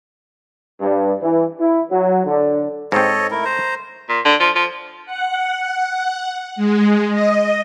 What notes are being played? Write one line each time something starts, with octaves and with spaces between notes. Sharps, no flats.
G2
E3
E4
F#3
D3
G#2 C4 A4 C#5 D#5
A3 E4 A#4
C5 A#5
A#2
D3
F3
F3
F#5
G#3
D#5